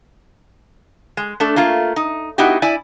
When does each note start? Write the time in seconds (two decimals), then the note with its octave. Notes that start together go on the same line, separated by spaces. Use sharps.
1.17 G#3
1.40 A3 D4 A4
1.56 A3 A#3 F4
1.96 D#4
2.38 B3 D#4 E4 F#4 G4
2.62 E4 D5 G#5